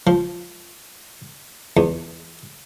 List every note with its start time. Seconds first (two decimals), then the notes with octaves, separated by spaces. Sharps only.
0.07 F3
1.77 E2